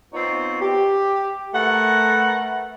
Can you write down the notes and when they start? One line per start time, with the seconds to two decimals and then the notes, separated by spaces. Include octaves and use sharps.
0.13 B3 C4 D#4 F4 C#5
0.61 G4
1.54 A3 A#4 B4 F#5